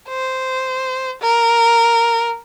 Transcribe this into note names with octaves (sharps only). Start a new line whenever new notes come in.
C5
A#4